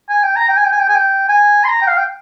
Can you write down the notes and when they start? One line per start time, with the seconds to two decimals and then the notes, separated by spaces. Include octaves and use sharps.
0.09 G#5
0.23 G5
0.36 A#5
0.48 G5
0.57 G#5
0.65 G5
0.72 G#5
0.80 G5
0.88 G#5
0.95 G5
1.28 G#5
1.64 C6
1.68 A#5
1.81 G5
1.87 F5
1.98 G5